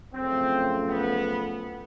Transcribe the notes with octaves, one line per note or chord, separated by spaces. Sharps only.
F#2 C#3 F3 A3 C4
B3